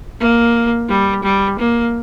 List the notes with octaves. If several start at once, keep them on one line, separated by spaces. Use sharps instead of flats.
A#3
G3
G3
A#3